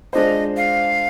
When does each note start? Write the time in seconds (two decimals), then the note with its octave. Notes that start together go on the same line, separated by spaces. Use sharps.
0.13 G#3 D4 F4 C5 D#5
0.57 F5